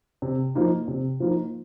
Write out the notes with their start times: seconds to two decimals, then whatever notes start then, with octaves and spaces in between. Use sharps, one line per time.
0.22 C3
0.55 F3 A#3 D#4
0.88 C3
1.20 F3 A#3 D#4